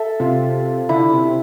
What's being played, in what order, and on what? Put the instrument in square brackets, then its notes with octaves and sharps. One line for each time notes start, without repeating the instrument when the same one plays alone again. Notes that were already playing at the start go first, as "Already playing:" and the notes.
Already playing: [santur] A4 E5
[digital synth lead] C3 [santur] F4
[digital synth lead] D3 [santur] E4
[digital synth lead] C3